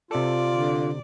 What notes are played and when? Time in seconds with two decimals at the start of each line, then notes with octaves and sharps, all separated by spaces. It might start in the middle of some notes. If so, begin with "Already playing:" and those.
0.11 C3 F4 A4 D5
0.51 D3